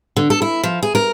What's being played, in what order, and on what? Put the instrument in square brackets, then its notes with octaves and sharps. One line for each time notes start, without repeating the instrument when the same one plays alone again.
[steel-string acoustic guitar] D3
A4
E4
F3
G#4
A#4